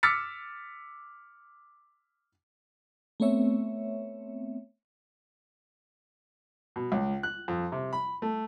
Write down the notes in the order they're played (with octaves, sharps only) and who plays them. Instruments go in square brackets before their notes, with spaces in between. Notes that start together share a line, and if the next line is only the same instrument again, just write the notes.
[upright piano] D6 E6 F6 A6 B6 C#7
[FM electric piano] A3 B3 C4 C#5 E5
[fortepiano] B2
C#2
F#6
F2
C3
B5
A3